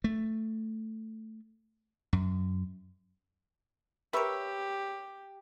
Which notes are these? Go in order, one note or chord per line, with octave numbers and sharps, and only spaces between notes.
A3
F#2
G4 A#4 B4 C#5 E5 B5